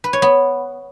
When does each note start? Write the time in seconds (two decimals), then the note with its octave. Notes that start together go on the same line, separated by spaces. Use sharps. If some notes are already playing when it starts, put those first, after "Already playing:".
0.04 B4
0.13 C#5
0.22 B3